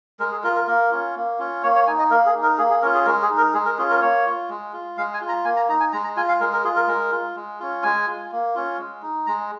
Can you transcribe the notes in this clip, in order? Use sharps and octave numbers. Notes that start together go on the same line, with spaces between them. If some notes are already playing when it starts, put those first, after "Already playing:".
G#3 A#4
G#4
F4 A#4
A#4
A#3 A#4
C#4 F4
A#3
C#4 F4
A#3 C#5
C#5
D#4 G#5
D#5
A#3 A#4
G#4
D#4
A#4
A#3 G#4
G#4
C#4 F4 A#4
G#4
G#3 A#4
G#4
D#4
A#4
G#3 G#4
A#4
C#4 F4 G#4
A#4
A#3 C#5
F4
G#3
F4
G#3 F5
G#5
F4
A#5
A#3 G#5
A#5
D#4 A#5
G#5
G#3 A#5
A#5
F4 G#5
F5
G#3 A#4
A#4
F4 G#4
A#4
G#3 A#4
F4
G#3
C#4 F4
G#3 G#5
F4
A#3
C#4 F4
G#3
D#4
G#3 A#5